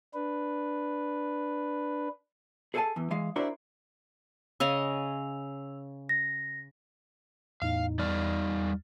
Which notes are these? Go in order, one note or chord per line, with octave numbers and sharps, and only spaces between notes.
D4 B4
G#4 A4 C5 F5 G#5 A5
E2 E3
E3 G#3 F5
D4 E4 F#4 A#4 C5 D5
C#3 D#5 G#5 E6 F7
A#6
E2 A2 D#4 F5
E2 G3 D#4 D5 F6